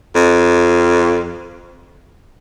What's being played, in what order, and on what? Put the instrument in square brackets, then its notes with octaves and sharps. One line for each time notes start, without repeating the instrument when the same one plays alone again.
[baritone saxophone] F2